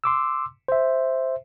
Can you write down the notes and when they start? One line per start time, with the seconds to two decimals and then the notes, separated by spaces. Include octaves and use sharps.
0.04 C6 D6 E6
0.68 C5 E5